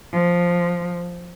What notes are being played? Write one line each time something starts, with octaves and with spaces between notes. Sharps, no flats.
F3